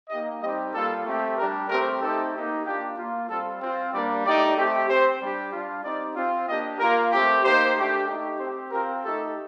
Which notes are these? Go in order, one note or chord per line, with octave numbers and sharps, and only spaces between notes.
A#3 D#4 G4 D#5
G3 C4 D#4 G4 D#5
G3 A#3 F4 A4
A3 C4 G4
G3 D4 G4 A#4
A3 C4 G4 A#4
A3 C4 D#4 G4 A4
A#3 D#4 G4
A#3 D4 F4 G4
A#3 F4
G3 C4 F4 A4
C4 F4
G3 A#3 D4 D5
A3 D#4 G4 D5
A3 C4 G4
C4 G4 C5
G3 D4 G4
G3 D4 F4
C4 D#4 G4 D5
C4 F4
A#3 D4 G4 D#5
A#3 F4 A#4
A3 C4 G4
A#3 D#4 G4 C5
A3 D4 G4
A3 D#4 G4
C4 G4 C5
C4 F4 A#4
A3 D#4 G4 A4